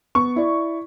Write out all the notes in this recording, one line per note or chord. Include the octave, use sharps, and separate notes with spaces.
B3 C#6
E4 D5